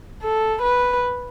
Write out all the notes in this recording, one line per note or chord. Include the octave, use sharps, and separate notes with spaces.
A4
B4